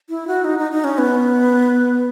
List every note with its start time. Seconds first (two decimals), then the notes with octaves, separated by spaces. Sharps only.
0.09 E4
0.27 F#4
0.44 D#4
0.59 D#4
0.72 D#4
0.84 C#4
0.98 B3